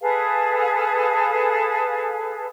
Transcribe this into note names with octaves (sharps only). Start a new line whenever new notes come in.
G#4 A4 B4 F5